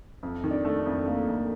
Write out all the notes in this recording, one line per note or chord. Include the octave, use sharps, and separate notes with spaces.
F2
D#3
D4
A3
D4
F2
A3 A#3
F2